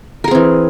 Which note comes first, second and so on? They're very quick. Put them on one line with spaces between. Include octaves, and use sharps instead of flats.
A#4 G#4 C4 E3